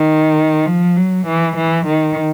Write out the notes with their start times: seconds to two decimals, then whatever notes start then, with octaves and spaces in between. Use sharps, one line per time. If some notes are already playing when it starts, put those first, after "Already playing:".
Already playing: D#3
0.67 F3
0.97 F#3
1.27 E3
1.57 E3
1.86 D#3